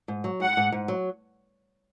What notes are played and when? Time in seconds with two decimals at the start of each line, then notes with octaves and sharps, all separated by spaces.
0.08 G#2
0.24 F#3
0.40 G#2 F#5
0.57 G#2
0.72 G#2
0.88 F#3